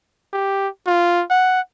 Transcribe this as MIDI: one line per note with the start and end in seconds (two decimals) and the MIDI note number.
0.33 0.68 67
0.87 1.24 65
1.30 1.60 78